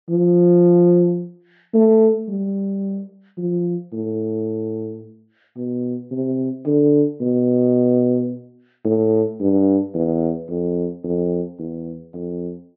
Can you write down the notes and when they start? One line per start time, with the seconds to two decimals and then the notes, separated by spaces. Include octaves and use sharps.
0.09 F3
1.74 A3
2.28 G3
3.38 F3
3.93 A2
5.57 B2
6.12 C3
6.66 D3
7.21 B2
8.85 A2
9.40 G2
9.94 E2
10.50 F2
11.04 F2
11.59 E2
12.14 F2